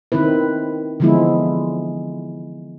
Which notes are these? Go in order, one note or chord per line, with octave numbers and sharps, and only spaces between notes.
D#3 C4 E4 B4
D3 E3 F3 G#3 B3 E4